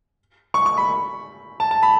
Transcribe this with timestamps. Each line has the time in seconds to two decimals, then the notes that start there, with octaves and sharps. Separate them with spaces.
0.54 C#6
0.66 C#6
0.77 B5
1.60 A5
1.71 A5
1.83 B5